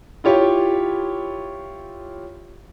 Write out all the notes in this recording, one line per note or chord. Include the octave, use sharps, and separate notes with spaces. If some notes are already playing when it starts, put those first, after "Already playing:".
E4 F4 G4 C#5